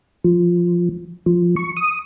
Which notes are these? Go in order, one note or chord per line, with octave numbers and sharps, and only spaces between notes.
F3
F3
C#6
D#6